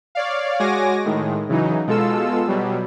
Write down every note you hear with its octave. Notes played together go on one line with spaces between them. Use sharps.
C#5 D5 F5
G#3 F#4 C#5 G#5 D6 A#6
A2 D#3 G#3
C#3 E3 F#3 D#4
B2 G#3 F4 A4 E6
B2 F#3 G3